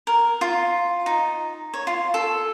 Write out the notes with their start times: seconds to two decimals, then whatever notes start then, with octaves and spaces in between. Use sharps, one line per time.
0.07 A#4
0.41 F4
1.06 D#4
1.74 C#5
1.87 F4
2.14 A4